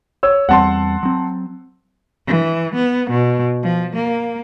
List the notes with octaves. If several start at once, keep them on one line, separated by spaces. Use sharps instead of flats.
C#5 E6
E2 G3 C4 F#5 A5 C6
F#3 C4
E3
B3
B2
F3
A#3